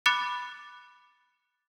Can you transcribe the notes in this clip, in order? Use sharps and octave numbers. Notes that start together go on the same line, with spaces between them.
B5 D6 F#6 A6 C#7